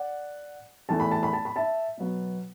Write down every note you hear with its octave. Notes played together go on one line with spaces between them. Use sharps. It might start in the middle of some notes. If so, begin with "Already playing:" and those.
Already playing: D5 F#5
E2 E3 A3 A5
B5
A5
B5
A5
B5
E5 A5
B2 F#3 B3